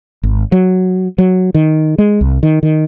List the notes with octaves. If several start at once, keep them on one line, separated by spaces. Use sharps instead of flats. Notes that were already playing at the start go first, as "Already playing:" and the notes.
G#1
F#3
F#3
D#3
G#3
C2
D#3
D#3